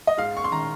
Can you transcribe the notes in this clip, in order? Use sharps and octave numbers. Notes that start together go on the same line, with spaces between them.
D#5
G#2 F5
C#6
C6
D#3 A#5